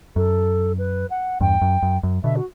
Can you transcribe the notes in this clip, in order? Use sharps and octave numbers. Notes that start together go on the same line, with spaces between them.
F#2 A4
B4
F#5
E2 G2 G5
F#2
F#2
F#2
B2 D3 E5
F#4